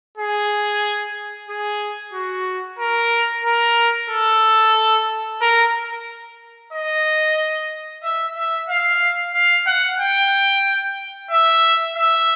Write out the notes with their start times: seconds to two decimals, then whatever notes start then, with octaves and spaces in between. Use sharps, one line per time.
0.17 G#4
1.49 G#4
2.14 F#4
2.79 A#4
3.45 A#4
4.10 A4
5.41 A#4
6.73 D#5
8.04 E5
8.37 E5
8.69 F5
9.34 F5
9.66 F#5
10.00 G5
11.31 E5
11.96 E5